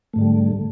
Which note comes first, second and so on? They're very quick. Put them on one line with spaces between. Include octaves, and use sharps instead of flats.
A3 G#2 D3 G3